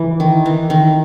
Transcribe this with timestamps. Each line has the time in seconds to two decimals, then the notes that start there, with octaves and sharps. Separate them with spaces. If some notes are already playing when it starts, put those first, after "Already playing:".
Already playing: E3
0.20 D#3
0.46 E3
0.70 D#3